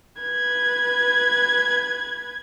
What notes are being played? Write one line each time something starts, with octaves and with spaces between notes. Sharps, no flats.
B4 G#6